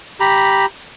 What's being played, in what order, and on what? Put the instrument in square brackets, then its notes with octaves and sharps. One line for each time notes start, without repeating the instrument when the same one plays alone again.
[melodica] G4 A#5 B5